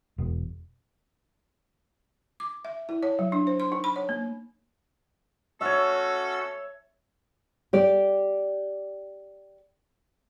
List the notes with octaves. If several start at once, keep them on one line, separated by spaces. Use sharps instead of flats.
E1
D6
E5
E4
C#5
F#3
D4
C5
C6
D#4
B5
C#5
A#3
C#4 F#4 A4 C#5 E5
G4 D5